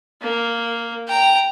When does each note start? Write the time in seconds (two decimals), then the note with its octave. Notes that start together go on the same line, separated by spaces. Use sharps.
0.22 A#3
1.08 G5 A#5